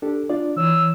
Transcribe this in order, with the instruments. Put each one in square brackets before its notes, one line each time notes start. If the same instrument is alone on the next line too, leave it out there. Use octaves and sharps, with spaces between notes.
[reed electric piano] D4 G4 A4
D4 F4 D5
[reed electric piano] E3 C#5 [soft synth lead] E6